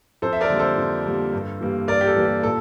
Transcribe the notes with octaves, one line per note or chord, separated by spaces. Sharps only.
F2 A4 C5
E5
A#4 D5
D3 G3 A#3
A4 C5
F2
D3 G3 A#3
G2
E3 G3 A#3
G2 A#4 D5
G4
A4
E3 G3 A#3
G4
A#2 A4